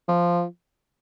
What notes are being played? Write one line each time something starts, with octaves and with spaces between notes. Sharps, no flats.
F3